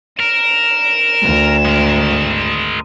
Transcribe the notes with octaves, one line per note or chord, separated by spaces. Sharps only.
A#4 E7
D2
G#3 A#4